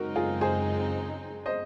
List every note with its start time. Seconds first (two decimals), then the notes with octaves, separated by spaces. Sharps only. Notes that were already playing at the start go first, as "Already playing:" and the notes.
Already playing: F#2 C#3 G#3 C4 D#4 F#4 A#4
0.16 F4 G#4
0.41 G#4 C5
1.46 C5 D#5